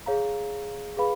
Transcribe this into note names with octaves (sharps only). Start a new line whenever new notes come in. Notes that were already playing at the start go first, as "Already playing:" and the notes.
G#4 C#5 F5 A#5
G#4 B4 F5 B5